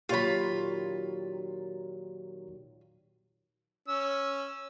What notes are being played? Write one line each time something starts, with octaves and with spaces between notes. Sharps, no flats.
A#2 D#3 F#3 F4 G4 C#5 B5
C#4 E6